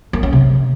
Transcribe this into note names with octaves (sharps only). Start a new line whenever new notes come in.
A#3
C#4
C3